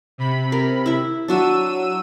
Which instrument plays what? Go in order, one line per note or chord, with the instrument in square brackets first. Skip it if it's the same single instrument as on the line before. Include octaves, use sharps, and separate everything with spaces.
[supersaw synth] C3 B5
[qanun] A#4
E4 E5
[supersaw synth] F#3 E6 D#7 [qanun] D4 F#4 E5